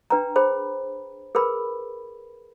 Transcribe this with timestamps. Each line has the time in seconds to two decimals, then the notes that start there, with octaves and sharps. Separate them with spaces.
0.10 D4 B4 G5 A#5
0.36 G#4 C5 B5
1.35 G#4 A#4 B4 B5